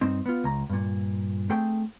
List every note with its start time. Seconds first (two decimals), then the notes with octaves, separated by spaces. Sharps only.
0.01 G2 C4 D#4
0.26 B3 F4
0.44 C#2 A#5
0.70 G2 A#2
1.50 A3 C4 G#4 G5